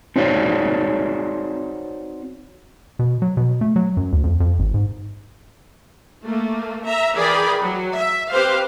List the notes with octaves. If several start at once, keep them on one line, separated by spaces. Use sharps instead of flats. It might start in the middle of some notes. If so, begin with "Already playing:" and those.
C4 D#4 F#4 C#5 D5 F5
B2
F#3
B2
A3
F#3
F#2
D2
F2
F2
G#1
G#2
A3 A#3
E5 A#5
E3 G#4 A#4 D5 G5 B5
F#3
E5
C4 G4 B4 C5 F5